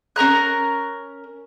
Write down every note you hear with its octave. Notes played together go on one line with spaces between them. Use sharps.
C#4 A#4 A#5 F#6